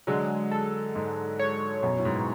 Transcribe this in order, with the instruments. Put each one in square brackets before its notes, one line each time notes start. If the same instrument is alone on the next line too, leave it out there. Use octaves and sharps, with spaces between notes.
[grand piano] D3 F#3 [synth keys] G#3
[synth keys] A4
[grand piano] G#2 [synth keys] G#3
[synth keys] C#5
[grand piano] F#2 [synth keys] B2
[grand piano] A2
G#2